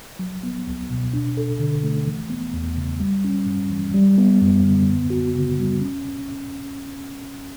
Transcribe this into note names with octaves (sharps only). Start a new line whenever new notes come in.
F#3
B3
C#2
B2
D4
A4
D3
A3
E3
B3
E2
C#3
G3
C#4
G2
E3
G3
B3
F#2
D3
B3
F#4
C#3
G3
C#4